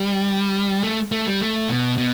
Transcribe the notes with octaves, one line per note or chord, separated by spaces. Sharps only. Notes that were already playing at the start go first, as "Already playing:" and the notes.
Already playing: G3
A3
A3
G3
A3
B2
B2